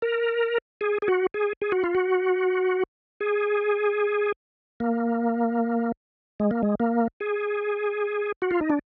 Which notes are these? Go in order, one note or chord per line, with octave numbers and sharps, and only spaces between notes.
A#4
G#4
G#4
F#4
G#4
G#4
F#4
F4
F#4
G#4
A#3
G#3
A#3
G#3
A#3
G#4
F#4
F4
D#4
D4